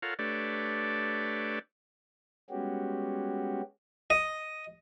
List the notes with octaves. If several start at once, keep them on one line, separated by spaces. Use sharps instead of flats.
F4 A4 A#4 C#5 F5 F#5
A3 D4 G4 B4 C#5 D5
G3 G#3 B3 C#4 F#4 G4
D#5